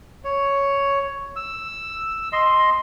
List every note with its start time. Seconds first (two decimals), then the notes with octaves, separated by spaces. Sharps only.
0.24 C#5
1.36 E6
2.33 D#5 C6